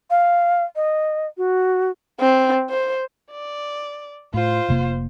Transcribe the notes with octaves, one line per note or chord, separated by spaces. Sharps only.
F5
D#5
F#4
C4
C5
D5
A2 F4 C5
F1 C3 A#3